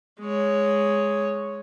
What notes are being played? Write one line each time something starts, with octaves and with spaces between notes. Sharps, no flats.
G#3 C#5